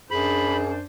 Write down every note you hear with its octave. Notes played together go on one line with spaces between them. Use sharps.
F#2 D4 G#4 C5 B5